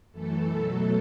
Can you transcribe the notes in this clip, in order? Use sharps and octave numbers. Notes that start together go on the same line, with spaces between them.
F#2 E3 A3 A4
B2 F#3 A3